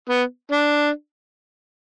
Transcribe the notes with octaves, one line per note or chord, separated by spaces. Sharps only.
B3
D4